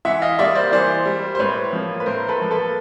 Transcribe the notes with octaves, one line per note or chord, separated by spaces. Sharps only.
E3 E5 F#5
D#5 F5
G3 A#3 D5 E5
C5 D5
E3 C5 D5
G3 A#3
C5
A2 B4 C#5
F3 A#3
B4
A2 A#4 C5
A4 B4
F3 A#3
A4 B4